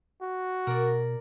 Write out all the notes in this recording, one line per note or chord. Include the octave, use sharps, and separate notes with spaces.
F#4
B2 A#4 D5